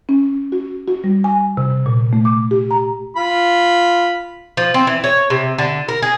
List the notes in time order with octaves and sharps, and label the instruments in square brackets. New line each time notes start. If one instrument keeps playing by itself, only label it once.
[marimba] C#4
F#4
F#4
G3
G#5
C3
A#2
A3
D6
G4
A#5
[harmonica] F4 B5
[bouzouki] F3
C4
E3
C#5
C3
D3
A#4
G#4